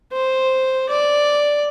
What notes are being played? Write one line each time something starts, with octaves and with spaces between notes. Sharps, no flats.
C5
D5